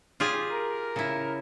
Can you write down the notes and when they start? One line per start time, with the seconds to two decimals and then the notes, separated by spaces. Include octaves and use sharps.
0.20 F4 G4 G#4
0.51 A#4
0.96 C#3 E4